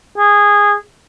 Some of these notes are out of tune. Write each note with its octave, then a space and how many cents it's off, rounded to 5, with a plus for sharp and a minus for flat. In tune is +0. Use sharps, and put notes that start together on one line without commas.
G#4 -15